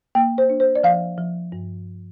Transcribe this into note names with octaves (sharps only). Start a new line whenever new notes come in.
A#3 G5
C5
D4
C5
D5
F3 F5
F3
G2